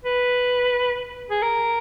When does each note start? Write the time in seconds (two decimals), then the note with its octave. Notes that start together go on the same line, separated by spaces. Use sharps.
0.05 B4
1.30 G#4
1.42 A#4